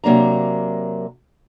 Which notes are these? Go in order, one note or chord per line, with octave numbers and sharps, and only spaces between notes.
C3 F#3 A#3 D4 A#5